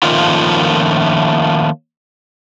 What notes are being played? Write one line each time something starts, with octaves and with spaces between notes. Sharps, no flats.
D#3 F3 A3 A#3 C#4 F4